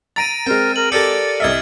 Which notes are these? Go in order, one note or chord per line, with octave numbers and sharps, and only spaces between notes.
A#5 A6 A#6 D7 D#7
G#3 C4 A#4 G5
A#4 F#7
G4 A4 A#4 D5 A6 C#7
C2 D#5 E5 F6 G#6